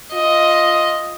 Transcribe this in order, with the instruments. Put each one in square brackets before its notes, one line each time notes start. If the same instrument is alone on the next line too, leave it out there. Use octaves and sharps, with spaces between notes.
[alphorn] F4 [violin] D#5